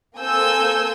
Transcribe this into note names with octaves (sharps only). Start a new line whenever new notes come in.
A#3 C4 A4 G#5 E6 G6